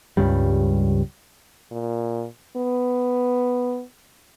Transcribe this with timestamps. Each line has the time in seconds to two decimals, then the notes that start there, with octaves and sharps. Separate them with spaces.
0.17 C#2 G2 C#3 G3
1.71 A#2
2.56 B3